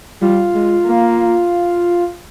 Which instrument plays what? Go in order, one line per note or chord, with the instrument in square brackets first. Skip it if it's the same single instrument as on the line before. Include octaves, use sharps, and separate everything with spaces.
[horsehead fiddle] G3 [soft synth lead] F4
[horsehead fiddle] G#3
A#3